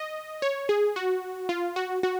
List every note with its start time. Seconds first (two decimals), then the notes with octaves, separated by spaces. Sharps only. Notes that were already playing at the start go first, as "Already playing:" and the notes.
Already playing: D#5
0.42 C#5
0.69 G#4
0.96 F#4
1.49 F4
1.76 F#4
2.03 F#4